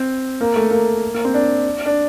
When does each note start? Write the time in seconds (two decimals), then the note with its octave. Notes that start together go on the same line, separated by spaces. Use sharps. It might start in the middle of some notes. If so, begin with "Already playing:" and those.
Already playing: C4
0.41 A#3
0.56 A3
0.71 A#3
1.14 A#3
1.25 C4
1.34 D4
1.86 D4